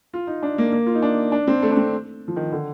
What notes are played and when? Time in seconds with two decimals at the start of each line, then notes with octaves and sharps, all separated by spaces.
0.14 F4
0.27 D#4
0.43 D4
0.58 A#3
0.72 A#3
0.86 F4
0.95 D#4
1.02 D4
1.32 D4
1.47 C4
1.62 A3
1.71 D4
1.77 C4
2.28 F3
2.36 D#3
2.52 D3